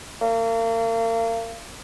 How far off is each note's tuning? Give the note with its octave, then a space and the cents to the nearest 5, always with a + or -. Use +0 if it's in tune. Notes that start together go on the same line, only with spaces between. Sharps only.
A#3 -35